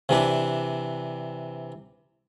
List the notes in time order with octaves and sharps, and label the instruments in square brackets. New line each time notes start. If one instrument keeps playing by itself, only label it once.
[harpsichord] C3 E3 D4